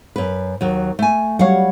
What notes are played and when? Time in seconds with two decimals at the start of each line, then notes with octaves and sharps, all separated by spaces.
0.16 F#2 B4
0.61 D#2 F#3
0.99 A3 G#5
1.39 F#3 G3 C#5 F5 F#5